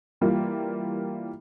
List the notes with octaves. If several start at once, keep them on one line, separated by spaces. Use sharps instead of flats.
E3 G3 A#3 F4